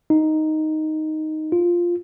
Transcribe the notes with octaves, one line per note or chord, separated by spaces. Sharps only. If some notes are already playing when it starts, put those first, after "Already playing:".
D#4
F4